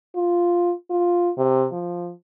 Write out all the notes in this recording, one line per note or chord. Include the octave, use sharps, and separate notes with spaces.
F4
F4
C3
F3